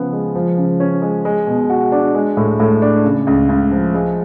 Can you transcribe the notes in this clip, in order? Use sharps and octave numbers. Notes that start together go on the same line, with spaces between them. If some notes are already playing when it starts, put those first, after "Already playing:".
Already playing: C#3 F3 B3
G#3
F3
C#3
C#4
G#3
G#3
B2
F#4
D4
G#3
A2
A2
D4
C#3
C#2
C#2
F3
G#3